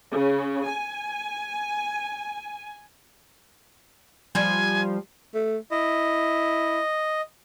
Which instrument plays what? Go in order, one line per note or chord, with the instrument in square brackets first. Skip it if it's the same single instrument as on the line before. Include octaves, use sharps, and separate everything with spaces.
[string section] C#3
G#5
[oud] F3 G3 [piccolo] G#5
[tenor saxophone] A3
[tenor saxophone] E4 [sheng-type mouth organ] D#5